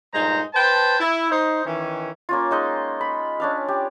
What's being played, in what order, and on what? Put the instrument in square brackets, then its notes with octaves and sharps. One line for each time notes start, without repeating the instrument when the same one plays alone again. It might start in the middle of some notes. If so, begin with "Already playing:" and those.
[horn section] G2 A#2 G#3 D#4 C5 A#5
B4 C5 G5 A5
E4
D#4 C5
D#3 E3 C#4
[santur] A#3 C#4 F4
G#3 D#4 D#5
B5
C#4 D4 F5
G4